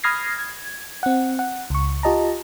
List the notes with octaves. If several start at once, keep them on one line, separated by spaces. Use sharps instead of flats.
B5 D#6 F6 G#6 A#6 C7
G#6
C4 F#5
F#5
C#2 C#6
F4 G4 D#5 A5 A#5